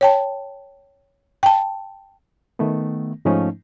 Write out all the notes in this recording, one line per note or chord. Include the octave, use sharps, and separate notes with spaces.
C#5 G5 A5
G5 A5
D#3 A3 B3
G#2 F3 A3 C#4 D#4